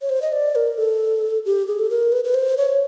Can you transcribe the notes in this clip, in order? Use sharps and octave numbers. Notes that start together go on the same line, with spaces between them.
C#5
C5
D#5
D5
A#4
A4
G4
G#4
A4
A#4
B4
B4
C5
C#5